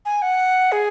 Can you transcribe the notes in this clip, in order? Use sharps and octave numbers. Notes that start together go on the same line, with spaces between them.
G#5
F#5
G#4